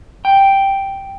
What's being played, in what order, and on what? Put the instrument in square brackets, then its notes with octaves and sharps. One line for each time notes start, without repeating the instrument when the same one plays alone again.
[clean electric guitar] G5